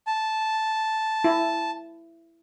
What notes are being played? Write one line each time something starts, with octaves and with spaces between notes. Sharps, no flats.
A5
E4